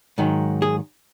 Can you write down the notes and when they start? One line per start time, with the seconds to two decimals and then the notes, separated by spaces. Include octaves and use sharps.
0.18 G#2 D#3 F#3
0.62 G#4